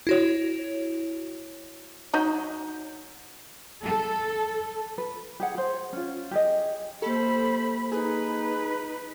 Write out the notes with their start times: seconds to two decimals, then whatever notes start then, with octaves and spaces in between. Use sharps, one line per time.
0.07 E4 F#4 C#5
2.14 F#3 D#4 D#5
3.83 A4
4.98 B4
5.40 G4 G#4 F#5
5.55 G#4 C5
5.93 C#4 F4
6.31 G4 G#4 D#5
7.02 A#3 G4 A4 C5 B5
7.92 D#4 G#4 B4